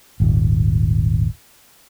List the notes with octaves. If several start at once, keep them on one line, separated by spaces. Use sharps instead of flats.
D#1 G#1